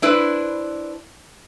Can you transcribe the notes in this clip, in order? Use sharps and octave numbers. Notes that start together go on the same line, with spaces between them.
D4 E4 B4 C5